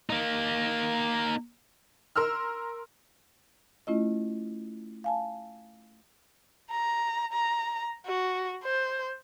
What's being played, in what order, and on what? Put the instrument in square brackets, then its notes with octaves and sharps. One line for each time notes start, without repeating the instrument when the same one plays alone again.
[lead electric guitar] A#3 D#4
[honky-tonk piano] A#4 C6 E6 F6
[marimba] A3 C#4 E4 F4 D#5
F5 G#5 A5
[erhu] A#5
A#5
F#4
C5